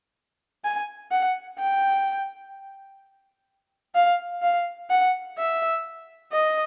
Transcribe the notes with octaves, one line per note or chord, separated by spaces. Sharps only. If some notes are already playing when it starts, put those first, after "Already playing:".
G#5
F#5
G5
F5
F5
F#5
E5
D#5